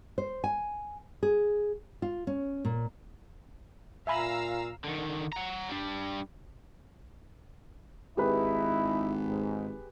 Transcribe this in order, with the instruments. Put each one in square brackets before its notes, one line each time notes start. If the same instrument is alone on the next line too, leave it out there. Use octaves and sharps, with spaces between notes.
[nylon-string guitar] C5
G#5
G#4
F4
C#4
A#2
[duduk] A#2 [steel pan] E5 G#5 B5 [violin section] F5 A#5 E6
[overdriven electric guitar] D3 D#3
F#5 A#5
G3 D4
[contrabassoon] G#1 [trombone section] D#4 E4 [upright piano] G4 G#4 B4
[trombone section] G#2